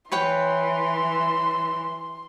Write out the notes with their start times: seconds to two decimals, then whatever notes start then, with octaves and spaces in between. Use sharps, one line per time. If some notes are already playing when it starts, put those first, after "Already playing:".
0.12 E3 B4 C#5 G5 C6